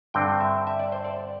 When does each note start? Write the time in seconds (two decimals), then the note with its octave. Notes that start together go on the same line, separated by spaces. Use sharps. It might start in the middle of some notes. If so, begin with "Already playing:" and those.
0.14 G2 D3 C4 G5
0.40 E5
0.67 E5
0.79 D5
0.92 C5
1.05 D5